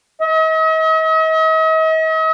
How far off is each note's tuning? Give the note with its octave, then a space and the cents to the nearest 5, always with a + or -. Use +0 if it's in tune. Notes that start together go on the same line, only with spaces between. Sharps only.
D#5 +45